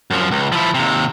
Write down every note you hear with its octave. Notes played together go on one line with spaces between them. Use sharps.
F#2 F3
C#2
F3 E4
D#2 C3